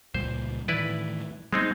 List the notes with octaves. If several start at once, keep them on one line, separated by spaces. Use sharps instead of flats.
C#2 A#2 G3 C5
A2 D#3 E3 E4 B4 D5
G3 G#3 B3 C4 D#4